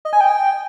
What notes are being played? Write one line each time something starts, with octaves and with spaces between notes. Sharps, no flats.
D#5
G#5
G5